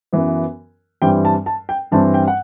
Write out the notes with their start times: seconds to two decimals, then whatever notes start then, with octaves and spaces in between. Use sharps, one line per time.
0.13 F#2 E3 B3
1.02 G2 E3 G3 C4 G5
1.25 A5
1.46 A5
1.69 G5
1.91 G2 E3 G3 C4 A5
2.14 G5
2.28 F#5